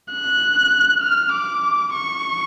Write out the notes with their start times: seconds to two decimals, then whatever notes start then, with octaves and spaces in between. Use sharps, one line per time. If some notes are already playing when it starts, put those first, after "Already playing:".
0.12 F#6
1.02 F6
1.34 D6
1.94 C#6